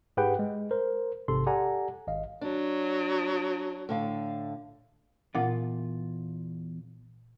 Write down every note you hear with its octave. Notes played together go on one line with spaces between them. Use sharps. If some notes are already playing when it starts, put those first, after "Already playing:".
G#2 G4 G#4 B4 F#5 G5
G#3
A#4 C5
A1 G#2 C3 A4 C6
G4 A4 D5 F#5 G#5 A#5
G#1 D#5 F5
F#3 D4
A2 D3 F5
E2 A#2 F4 F#5